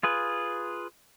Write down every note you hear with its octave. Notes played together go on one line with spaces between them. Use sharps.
F4 G#4 B4